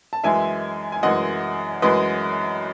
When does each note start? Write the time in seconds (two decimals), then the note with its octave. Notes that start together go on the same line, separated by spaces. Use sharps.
0.13 A5
0.24 F#2 E3 G#3 E5 G#5
0.92 G#5
1.03 F#2 E3 G#3 D#5 F#5
1.82 F#2 E3 G#3 B4 D#5